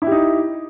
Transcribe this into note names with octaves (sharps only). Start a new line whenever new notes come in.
D#4 E4 G4